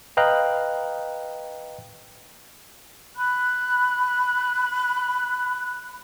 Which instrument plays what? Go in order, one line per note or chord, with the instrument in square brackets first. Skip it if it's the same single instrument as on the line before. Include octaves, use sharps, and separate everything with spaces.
[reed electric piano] B4 D#5 F5 G5 A#5 F#6
[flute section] B5 F#6